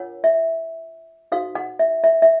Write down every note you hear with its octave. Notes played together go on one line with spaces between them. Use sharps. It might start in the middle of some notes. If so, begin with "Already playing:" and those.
Already playing: D4 F4 A#4 C#5 F#5
E5
D#4 F#4 A4 C5 F5
F#5
E5
E5
E5